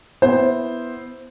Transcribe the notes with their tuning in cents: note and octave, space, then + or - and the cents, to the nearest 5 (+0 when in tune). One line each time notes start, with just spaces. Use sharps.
B3 +0 E4 +0 C5 +0